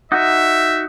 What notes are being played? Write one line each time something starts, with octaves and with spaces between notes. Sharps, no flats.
D#4 F#4 E5